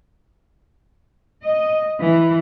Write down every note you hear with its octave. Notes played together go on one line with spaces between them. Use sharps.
D#5
E3